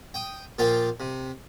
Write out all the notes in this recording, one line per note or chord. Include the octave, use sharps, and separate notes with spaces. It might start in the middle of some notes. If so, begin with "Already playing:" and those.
G5 D#6
A#2 F3 F4 G5 A5
C3